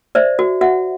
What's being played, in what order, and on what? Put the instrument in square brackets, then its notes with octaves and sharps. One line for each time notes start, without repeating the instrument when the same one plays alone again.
[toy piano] C5 D5 E5
F#4
F#4 E5 F#5